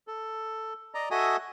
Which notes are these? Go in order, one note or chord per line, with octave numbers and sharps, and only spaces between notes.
A4
D5 D#5 A#5
F#4 A4 D#5 E5 G#5 D#6